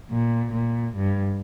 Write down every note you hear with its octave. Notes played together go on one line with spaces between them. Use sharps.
A#2
A#2
G2